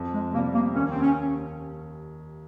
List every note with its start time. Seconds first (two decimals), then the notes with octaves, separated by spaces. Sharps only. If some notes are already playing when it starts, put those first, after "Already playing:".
Already playing: F2
0.13 G#3
0.33 C3 A#3
0.38 G3
0.54 A#3
0.75 D#2 C#4
0.90 C4
1.02 C#4